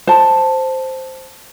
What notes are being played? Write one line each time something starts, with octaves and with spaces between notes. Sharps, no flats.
C5 A5